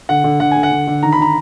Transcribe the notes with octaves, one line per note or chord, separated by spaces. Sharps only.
D3 F#5
D3
D3 F#5
D3 G#5
F#5
D3
D3
D#3 A#5
B5
D#3 A#5